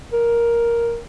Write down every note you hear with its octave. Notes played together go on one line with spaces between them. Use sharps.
A#4